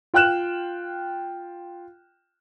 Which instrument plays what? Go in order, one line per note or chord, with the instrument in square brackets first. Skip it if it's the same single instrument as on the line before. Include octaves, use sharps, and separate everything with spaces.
[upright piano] F4 G5 F6 F#6 E7